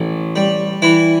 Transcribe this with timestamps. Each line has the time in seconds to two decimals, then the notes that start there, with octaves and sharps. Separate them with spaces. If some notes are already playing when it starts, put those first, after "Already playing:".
Already playing: A1
0.36 G3
0.82 E3 E4